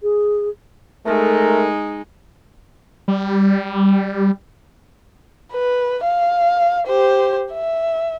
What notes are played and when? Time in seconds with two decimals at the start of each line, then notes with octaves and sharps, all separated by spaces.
0.03 G#4
1.06 G#3 A3 D#4 A#4
3.08 G3
5.53 B4
6.04 F5
6.87 G4 C5
7.53 E5